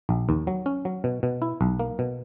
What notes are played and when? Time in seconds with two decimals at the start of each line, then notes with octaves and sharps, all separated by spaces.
0.09 A#1
0.29 D#2
0.47 F#3
0.66 C#4
0.85 F#3
1.04 B2
1.23 B2
1.42 E4
1.61 B1
1.79 A#3
1.99 B2